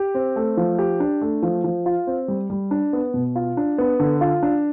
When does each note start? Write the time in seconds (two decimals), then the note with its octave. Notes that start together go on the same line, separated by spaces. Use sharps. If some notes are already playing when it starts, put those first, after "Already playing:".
Already playing: G4
0.15 C4
0.36 A3
0.57 F3
0.79 G4
1.00 D4
1.21 A3
1.43 F3
1.64 F3
1.86 F4
2.07 C4
2.28 G3
2.50 G3
2.71 D4
2.93 B3
3.14 B2
3.36 F4
3.57 D4
3.78 B3
4.00 D3
4.21 F4
4.43 D4